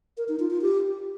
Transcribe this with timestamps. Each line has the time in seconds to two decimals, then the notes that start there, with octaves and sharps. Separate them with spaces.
0.17 A#4
0.28 D#4
0.39 F4
0.50 F4
0.61 G4